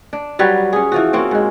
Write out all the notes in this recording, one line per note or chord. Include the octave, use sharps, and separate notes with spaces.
D4
F#3 G3 F#4 B4
C#4 G#4
E3 F3 F#4
A#3 C4 C#4 F#4
G#2 G#3